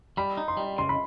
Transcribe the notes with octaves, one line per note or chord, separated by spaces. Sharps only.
G3 B5
D#4
C6
G3
C#3 C6
B5